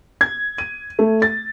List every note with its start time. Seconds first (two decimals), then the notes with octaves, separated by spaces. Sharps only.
0.21 G#6
0.58 D#7
0.99 A3
1.22 A6